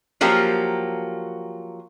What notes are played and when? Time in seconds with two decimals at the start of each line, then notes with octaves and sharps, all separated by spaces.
0.21 F3 F#3 A#3 G4